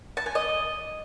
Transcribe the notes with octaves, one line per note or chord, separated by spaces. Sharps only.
A5
G#5
D#5